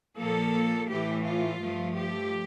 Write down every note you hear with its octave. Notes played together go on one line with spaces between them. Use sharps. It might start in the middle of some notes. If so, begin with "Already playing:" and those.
A#2 F3 A#3 A4
A2 E3 A3 G4
F4
G2 F3 A3
G4